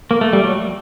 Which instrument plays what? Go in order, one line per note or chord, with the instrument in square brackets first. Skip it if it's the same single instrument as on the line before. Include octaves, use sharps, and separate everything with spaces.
[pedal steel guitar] A#3
A3
G3
F#3